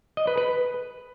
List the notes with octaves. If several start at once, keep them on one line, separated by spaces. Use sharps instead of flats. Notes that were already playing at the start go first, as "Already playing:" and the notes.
D#5
B4
B4